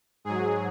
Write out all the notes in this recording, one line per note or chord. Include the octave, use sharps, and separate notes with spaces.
G#2 F#3 G#4